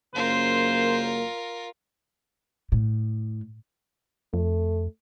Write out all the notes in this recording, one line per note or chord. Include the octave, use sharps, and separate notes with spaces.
F#2 C#3 A#3 F4 A#4 C5
A2
F2 A3